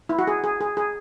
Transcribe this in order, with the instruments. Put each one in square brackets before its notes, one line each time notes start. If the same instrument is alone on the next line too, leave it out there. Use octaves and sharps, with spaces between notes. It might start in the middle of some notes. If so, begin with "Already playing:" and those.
[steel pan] E4
F#4
G#4
G#4
G#4
G#4